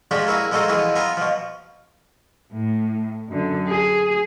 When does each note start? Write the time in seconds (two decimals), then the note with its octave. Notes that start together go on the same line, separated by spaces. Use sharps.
0.11 F3 G#3 D4 F#4 G4
0.27 A#3 E4 F#4 G#4
0.51 F3 G#3 D#4 F#4 A4 C5
0.68 B2 E3 F3 G#4
0.96 B3 F4 G#5 A#5
1.17 B2 F3
2.53 A2
3.29 F#2 D3
3.67 G#4